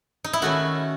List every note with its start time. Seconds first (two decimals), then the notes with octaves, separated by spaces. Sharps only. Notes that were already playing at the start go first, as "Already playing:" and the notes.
0.24 D#4
0.33 E4
0.42 D#3 A3 C#4 F#4